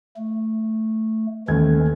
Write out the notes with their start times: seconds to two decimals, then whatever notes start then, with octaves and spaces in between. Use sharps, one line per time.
0.17 A3
1.48 D#2 E3 G#3 A3 C#4 G#6